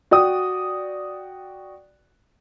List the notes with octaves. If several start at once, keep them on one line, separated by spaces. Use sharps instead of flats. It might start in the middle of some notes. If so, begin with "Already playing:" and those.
F#4 D5 G5 D#6